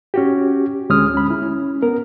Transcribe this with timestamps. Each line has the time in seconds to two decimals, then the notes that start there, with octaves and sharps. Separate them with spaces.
0.14 C#4 F#4 G4
0.90 D2 G#3 C#4 D#6 F6
1.14 C#4 B5
1.30 E4
1.42 C#4
1.82 B3 A#4